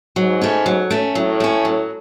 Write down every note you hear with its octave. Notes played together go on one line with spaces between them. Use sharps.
G#2 F#3
A3 C#4
F#3
A3 C#4
A2 F#3
A3 C#4
F#3